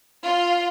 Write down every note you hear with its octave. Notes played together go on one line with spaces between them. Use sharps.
F4